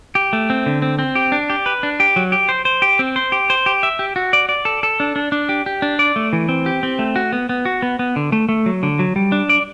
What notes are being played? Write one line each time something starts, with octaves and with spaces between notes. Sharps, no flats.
G4
A3
C4
D3
C4
C4
G4
D4
G4
B4
D4
G4
F#3
G4
C5
C5
G4
C4
C5
G4
C5
G4
E5
G4
F#4
D5
D5
A4
A4
D4
D4
D4
G4
G4
D4
D5
A3
E3
C4
G4
C4
A3
F#4
B3
B3
F#4
B3
B3
D3
A3
A3
F#3
D3
F#3
G3
D4
D5